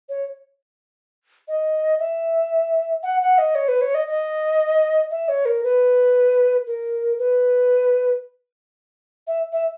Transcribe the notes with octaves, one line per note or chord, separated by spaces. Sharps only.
C#5
D#5
E5
F#5
F#5
D#5
C#5
B4
C#5
D#5
D#5
E5
C#5
A#4
B4
A#4
B4
E5
E5